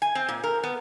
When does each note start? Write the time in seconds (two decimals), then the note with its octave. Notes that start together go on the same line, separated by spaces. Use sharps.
0.02 G#5
0.15 C4
0.29 A#2
0.44 A#4
0.63 B3